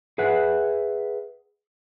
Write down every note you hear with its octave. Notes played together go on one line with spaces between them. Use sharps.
G#4 B4 E5 F#5